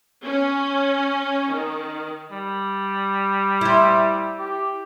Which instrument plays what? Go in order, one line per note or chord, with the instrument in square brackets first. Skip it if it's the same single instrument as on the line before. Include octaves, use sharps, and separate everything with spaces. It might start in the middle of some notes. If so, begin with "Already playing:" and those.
[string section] C#4
D#3
[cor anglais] G3
[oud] E4 C5
[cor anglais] G4